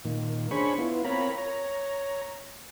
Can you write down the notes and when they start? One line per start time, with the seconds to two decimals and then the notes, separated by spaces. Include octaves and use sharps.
0.05 A#2 D#3
0.51 C#4 D4 G#4 C5 B5 C#6
0.78 B3 E4 F4
1.05 C4 F4 A#4 C#5 A#5 B5
1.38 C#5 A#5